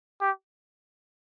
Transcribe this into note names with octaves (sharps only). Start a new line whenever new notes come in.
G4